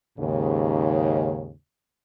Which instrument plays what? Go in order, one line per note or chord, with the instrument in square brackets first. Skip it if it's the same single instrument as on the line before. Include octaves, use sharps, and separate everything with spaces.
[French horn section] D#2 G#2 C#3